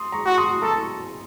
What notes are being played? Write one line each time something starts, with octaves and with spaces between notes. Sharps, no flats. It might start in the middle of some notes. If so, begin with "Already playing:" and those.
Already playing: C6 D#6
A#5 C#6
F#4
C6 D#6
A4 A#5 C#6